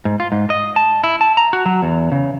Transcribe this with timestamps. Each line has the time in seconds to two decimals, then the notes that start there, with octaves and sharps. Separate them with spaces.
0.05 G#2
0.20 F4
0.32 G#2
0.50 D#5
0.76 A5
1.04 E4
1.21 A5
1.37 A#5
1.53 F#4
1.66 F#3
1.82 E2
2.12 C#3